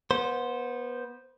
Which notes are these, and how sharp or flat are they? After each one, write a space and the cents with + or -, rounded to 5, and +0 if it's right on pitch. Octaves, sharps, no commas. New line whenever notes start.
B3 -25 C5 +0